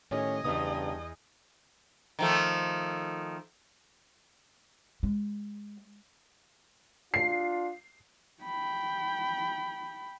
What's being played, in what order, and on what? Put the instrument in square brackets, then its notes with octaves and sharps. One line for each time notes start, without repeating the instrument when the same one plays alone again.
[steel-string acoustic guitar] A2 D#3 G4 [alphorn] C#4 [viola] D#5 G#5
[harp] E2 D#6 [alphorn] G2 [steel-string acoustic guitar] C#3 B3 D#4
[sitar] D#3 F3 A3
[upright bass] G#3
[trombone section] D4 F4 [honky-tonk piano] C7
[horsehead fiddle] G5 B5